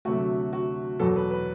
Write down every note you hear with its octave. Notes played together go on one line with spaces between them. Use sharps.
D2 C3 F#3 A3 F#4
F#4
E2 B2 F#3 A4
A4
B4
B4